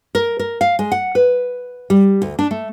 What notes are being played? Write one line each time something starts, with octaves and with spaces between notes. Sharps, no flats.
A#4
A#4
F5
G#3
F#5
B4
G3
D2
D4
A3